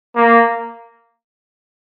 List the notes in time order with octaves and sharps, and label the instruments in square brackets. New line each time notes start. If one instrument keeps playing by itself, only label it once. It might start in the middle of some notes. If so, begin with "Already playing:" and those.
[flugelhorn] A#3